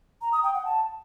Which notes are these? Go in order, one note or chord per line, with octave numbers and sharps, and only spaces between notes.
A#5
D#6
G5
F#5
A5